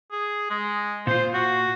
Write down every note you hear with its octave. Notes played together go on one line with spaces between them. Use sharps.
G#4
G#3
A#2 F4 C5
F#4